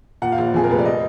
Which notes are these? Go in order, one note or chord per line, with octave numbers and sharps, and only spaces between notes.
A#2 F#5
F5
A#1
F2 G#4
A#4
F1 B4
D5
D#5